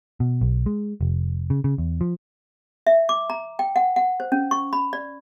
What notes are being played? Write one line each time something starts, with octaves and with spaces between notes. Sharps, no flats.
B2
B1
G#3
F1
C#3
C#3
E2
F3
E5
D6
A#5
G5
F#5
F#5
C5
C#4
C#6
B5
D5